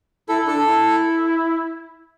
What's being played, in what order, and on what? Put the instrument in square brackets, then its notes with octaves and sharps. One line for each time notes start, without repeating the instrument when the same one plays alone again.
[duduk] E4 [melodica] A4
[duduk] D4 [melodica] A4
[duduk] E4